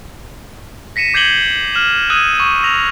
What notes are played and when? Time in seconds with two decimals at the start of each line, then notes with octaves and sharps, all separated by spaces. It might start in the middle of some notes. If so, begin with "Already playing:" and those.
0.96 A#6 B6 C#7 D#7 E7
1.14 D6 G6 G#6 C7 F#7 G7
1.74 F6 E7 F#7
2.10 D#6 E6 F#6 G#6 D#7
2.37 C#6 D#7
2.63 E6 A#6 F7